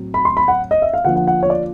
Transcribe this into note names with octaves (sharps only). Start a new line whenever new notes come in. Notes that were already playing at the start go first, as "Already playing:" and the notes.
Already playing: A2 F#3 C4
B5
C6
B5
F#5
D#5
E5
F5
D3 F3 A#3 F#5
F#5
F#5
C#5
D5